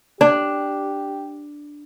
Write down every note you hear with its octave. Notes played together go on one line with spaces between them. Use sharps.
D4 G4